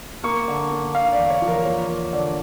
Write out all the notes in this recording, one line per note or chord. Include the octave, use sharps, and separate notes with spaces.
A#3 C#6
D3
A#3
D3 F5
D5
E2
C#5
F3
A#4
A#3 C#5
A#3
D3 D5